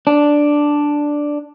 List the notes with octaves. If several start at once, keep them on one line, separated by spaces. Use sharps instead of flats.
D4